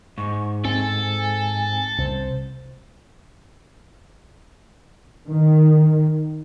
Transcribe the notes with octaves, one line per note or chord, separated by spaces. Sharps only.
G#2 C#6
C4 A4 G#5
C2 C5
D#3